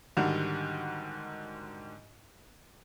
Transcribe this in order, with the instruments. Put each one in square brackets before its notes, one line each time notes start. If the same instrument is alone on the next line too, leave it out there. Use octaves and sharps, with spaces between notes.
[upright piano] G#2 D3 D#3 G3 F#4